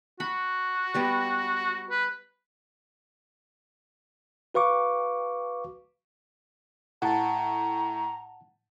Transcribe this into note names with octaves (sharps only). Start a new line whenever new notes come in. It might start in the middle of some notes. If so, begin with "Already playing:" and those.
F#4 F#5 B5
G3 B3 G4
B4
F#4 B4 F5 C#6 D6
A2 F#5 A5 A#5